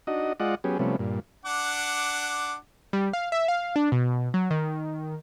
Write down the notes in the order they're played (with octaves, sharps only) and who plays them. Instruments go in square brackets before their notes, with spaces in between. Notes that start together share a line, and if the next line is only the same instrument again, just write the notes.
[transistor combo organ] D4 D#4 F#4 D#5
G#3 F4 D5 D#5 F#5
F#3 B3 C#4 G4 G#4
C3 F3 G3 A3 B3 C#4
G2 A#2
[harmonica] D4 F#5 D6
[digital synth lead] G3
F5
E5
F5
D4
B2
F#3
D#3